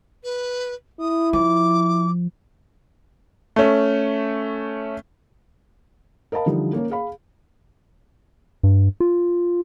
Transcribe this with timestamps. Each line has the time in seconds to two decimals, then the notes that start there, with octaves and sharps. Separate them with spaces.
0.24 B4
1.00 E4 D#6
1.33 F3 D6
3.56 A3 C#4
6.32 A#4 D#5 F5 A5 B5
6.46 D3 E3 F3 G3 D#4
6.73 A#3 C#4 A#4
6.90 G#4 F5 B5
8.63 G2
9.00 F4